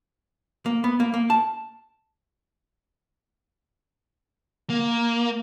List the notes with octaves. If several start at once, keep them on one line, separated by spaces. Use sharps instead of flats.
A#3
B3
A#3
A#3
A5
A#3